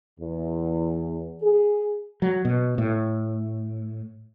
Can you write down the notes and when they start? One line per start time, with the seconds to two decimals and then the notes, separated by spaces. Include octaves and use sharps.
0.20 E2
1.43 G#4
2.22 F#3
2.45 B2
2.78 A2